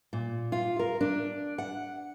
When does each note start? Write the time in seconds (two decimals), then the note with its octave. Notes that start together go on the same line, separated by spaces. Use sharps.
0.13 A#2
0.52 F4
0.79 A#4
1.01 D4
1.58 F#5